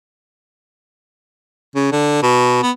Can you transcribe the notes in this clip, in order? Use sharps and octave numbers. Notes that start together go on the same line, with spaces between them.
C#3
D3
B2
B3